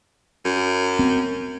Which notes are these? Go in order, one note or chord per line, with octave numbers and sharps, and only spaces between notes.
F#2
C4